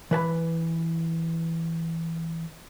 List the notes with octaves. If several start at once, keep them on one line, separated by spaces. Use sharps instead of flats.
E3 B4 A5 B5